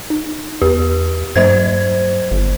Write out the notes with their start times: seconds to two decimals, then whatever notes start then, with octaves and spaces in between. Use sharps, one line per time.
0.10 D#4
0.62 E2 G4
1.36 G2 F#3 C5 G#6
2.31 G1